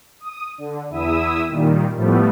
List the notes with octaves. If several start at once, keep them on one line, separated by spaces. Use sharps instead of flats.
D#6
D3
E2 E4 E5 D#6 E6
A#2 D#3 G3
A2 F3 G3 A3 B3